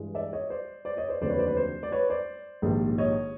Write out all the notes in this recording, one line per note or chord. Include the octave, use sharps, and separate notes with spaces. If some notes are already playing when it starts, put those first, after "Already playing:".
Already playing: G2 E3 G#3
D5 E5
C#5 D#5
C5 D5
C5 D5
C#5 D#5
C5 D5
F1 D#2 D3 F#3 A3 C5 D5
B4 C#5
C5 D5
B4 C#5
C5
D5
B4 C#5
C5 D5
A#1 G#2 D#3 G3 A#3
C#5 D#5